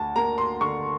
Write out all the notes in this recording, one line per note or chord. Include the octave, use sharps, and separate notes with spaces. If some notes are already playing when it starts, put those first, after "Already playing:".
Already playing: D2 A5
A#3 A#5
C6
D3 C#6